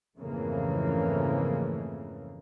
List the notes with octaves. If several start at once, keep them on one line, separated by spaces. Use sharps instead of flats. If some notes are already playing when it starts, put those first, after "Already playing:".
F2 G#2 C#3 E3 A3 A#3